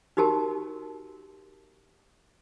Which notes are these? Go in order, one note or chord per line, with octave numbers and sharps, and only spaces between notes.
D#4 F#4 G4 A#4 A5